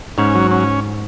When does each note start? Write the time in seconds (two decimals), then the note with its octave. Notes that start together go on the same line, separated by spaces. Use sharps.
0.18 G#2 C#4
0.35 F#3
0.51 C#4